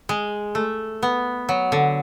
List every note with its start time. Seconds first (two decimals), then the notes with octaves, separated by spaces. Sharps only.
0.09 G#3
0.55 A3
1.03 B3
1.49 F#3
1.72 D3